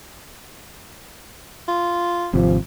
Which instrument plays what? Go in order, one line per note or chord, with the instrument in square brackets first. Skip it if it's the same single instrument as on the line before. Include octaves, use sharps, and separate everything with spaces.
[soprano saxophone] F4
[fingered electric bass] G#1 C3 [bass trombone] F3